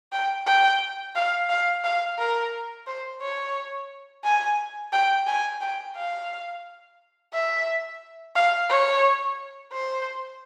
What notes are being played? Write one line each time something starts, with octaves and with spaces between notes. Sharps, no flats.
G5
G5
F5
F5
F5
A#4
C5
C#5
G#5
G5
G#5
G5
F5
E5
F5
C#5
C5